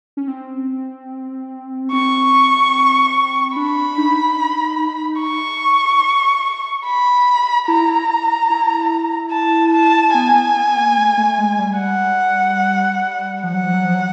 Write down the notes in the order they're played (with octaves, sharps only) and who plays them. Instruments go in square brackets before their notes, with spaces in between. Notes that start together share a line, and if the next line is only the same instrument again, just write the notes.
[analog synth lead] C#4
C4
[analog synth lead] C4 [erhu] C#6
[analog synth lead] D4 [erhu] B5
[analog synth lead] D#4
[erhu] C#6
B5
[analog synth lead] E4 [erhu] A#5
[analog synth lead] E4
[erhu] A5
A5
[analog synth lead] B3 [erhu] G#5
[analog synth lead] B3
B3
A#3
A3
A3
G#3
G3
[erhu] F#5
[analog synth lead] F3 [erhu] F#5
[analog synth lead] F#3
F3
F#3
F3
F#3